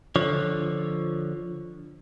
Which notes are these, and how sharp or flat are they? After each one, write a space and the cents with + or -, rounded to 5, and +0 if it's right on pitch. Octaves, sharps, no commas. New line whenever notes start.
D3 +0 F3 +0 C#5 +0